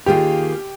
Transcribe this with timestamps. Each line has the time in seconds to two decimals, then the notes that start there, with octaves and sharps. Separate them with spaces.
0.06 D#2 D#3 A#3 F4 G4 G#4